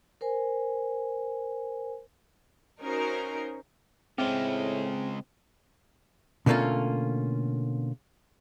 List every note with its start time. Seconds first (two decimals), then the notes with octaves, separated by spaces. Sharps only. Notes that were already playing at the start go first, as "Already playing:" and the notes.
0.21 A#4 C5 G#5
2.82 C#4 D#4 F#4 A#4 C5
4.18 A2 C#3 G#3 C4
6.46 B2 D3 A3 A#3 C#4 F4